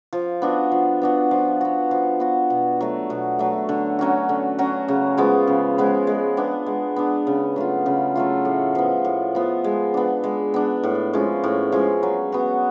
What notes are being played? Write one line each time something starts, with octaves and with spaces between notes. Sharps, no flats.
F3
B3 D4 F#4
F3
B3 D4 F#4
F3
B3 F#4
F3
B3 F#4
B2
F#3 A3
B2
F#3 A3
D3
F#3 C#4 F#4
D3
F#3 C#4 F#4
C#3
F3 G#3 B3
C#3
F3 G#3 B3
G#3
B3 D4
G#3
B3 D4
C#3
F#3 A3 F4
C#3
F#3 A3 F4
A2
F3 B3
A2
F3 B3
G#3
B3 D4
G#3
B3 D4
A2
F3 G#3 C#4
A2
F3 G#3 C#4
F#3
B3 F#4